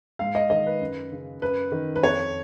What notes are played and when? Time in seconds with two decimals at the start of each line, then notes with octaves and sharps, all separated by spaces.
0.19 G#2 F5
0.35 D#5
0.50 D#3 D#5
0.66 B4
0.80 F#2
1.12 C#3
1.41 F#2 B4
1.72 D#3
1.96 B4
2.02 F2 C#5